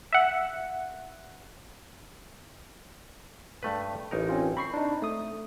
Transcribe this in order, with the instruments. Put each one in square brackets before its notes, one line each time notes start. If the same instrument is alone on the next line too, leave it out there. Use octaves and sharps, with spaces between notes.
[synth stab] E5 F#5
[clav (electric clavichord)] G2 A3 B4
A1 D#4 A#4
[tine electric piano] C4 C#4 F4
[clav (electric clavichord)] C4 [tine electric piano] B5 C#6 C7
[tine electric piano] D4 D#4
A3 D#6